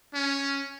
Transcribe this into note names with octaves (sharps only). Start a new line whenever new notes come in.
C#4